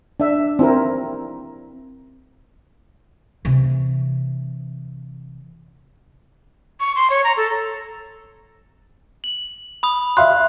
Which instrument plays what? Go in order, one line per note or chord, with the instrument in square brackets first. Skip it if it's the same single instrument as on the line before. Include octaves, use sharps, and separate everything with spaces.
[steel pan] D4 E5
C4 E4 A#4
[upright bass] C3 E3
[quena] C#6
C6
C#5
A#5
A4
[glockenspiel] F#7
B5 D#6
[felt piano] E5 F5 C6 [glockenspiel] F#6